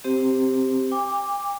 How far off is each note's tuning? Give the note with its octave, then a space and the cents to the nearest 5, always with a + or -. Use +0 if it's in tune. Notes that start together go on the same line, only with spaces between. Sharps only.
C4 +0 G4 +0 C5 +0
G5 +40 D6 +0